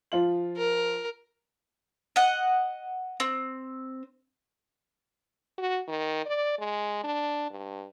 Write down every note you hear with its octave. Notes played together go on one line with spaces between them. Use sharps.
F3 F4 F#7
A#4
D#5 F#5
C4
F#4
D#3
D5
G#3
D4
G2